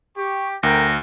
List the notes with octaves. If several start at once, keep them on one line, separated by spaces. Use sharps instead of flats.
G4 C#6
D2 A#4 G5 A#6